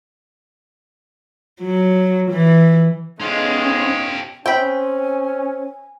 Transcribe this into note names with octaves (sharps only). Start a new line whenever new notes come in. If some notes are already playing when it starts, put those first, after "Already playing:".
F#3
E3
G#3 B3 C#4 F4 G4
C4 C#4 G5 G#5 B5